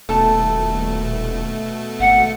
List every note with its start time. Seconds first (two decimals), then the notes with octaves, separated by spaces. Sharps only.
0.09 D#1 B2 A3 A4 A5
2.00 G#1 F#5